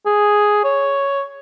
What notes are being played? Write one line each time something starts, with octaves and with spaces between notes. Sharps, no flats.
G#4
C#5